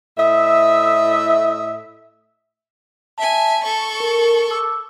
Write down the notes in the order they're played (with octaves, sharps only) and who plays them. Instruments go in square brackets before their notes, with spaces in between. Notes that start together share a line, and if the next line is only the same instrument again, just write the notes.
[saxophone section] A2 D#5 E5
[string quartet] E5 G#5 [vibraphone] A5
[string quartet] A4 C#6
[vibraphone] A#4
D6 E6